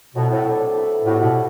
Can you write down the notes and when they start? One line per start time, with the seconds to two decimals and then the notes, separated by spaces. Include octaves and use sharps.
0.15 B2 F#3 A3 C4 E4
0.30 A2
0.45 D4 A4 E5
0.75 E4 B4 E5
1.05 A2 G3 B3 F#4
1.20 B2